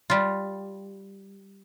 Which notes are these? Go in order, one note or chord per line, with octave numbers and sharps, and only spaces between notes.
G3 F4